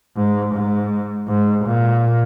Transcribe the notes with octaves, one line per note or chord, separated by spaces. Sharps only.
G#2
G#2
G#2
A#2